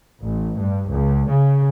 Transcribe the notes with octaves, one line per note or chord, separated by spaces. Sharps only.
A1
G2
C#2
C#3